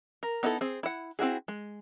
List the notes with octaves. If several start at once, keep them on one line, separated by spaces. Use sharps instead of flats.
A#4
B3 D#4 E4 G#4 A4
C4 G#4
E4 F#5
C4 E4 F#4 G#4
G#3